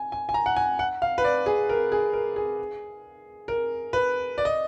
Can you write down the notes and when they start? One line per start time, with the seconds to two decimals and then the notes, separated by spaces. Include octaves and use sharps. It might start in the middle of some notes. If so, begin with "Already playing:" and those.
Already playing: G#5
0.12 G#5
0.29 G#5
0.34 A#5
0.46 F#5
0.57 G#5
0.79 F#5
1.02 F5
1.18 B4
1.24 D5
1.46 G#4
1.69 A#4
1.92 G#4
2.13 A#4
2.36 G#4
3.48 A#4
3.93 B4
4.38 D5
4.45 D#5